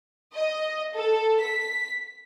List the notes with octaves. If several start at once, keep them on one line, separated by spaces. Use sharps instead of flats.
D#5
A4
B6